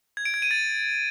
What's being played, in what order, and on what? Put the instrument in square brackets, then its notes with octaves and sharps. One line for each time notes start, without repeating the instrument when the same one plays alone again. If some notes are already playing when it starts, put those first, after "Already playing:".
[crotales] G#6
D7
G#6
D#7
A6